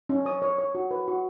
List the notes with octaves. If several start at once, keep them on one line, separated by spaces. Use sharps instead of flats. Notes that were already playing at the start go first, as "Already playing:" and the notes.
C#4
C#5 D#6
C#5
C#5
F#4
B4
F#4